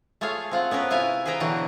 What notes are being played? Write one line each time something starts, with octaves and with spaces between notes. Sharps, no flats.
A3 F4 G#4 C#5 F5
C4 F4 F#5
B3 C#4 A#4 B4
C3 E4 F4 F5 G#5
G#4 B4 C5 G5 A#5
B2 D3 E3 F#3 F#4